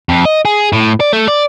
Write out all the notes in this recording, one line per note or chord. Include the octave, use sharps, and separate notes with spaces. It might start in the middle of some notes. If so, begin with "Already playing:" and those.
F2
D#5
G#4
A2
D5
A3
D5